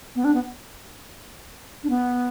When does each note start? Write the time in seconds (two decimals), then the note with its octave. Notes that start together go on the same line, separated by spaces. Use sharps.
0.15 B3
0.24 D4
0.34 B3
1.84 D4
1.90 B3